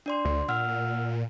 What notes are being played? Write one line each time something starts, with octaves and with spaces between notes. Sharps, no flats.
D4 D5 C6
D2
A#2 F#5 E6 F6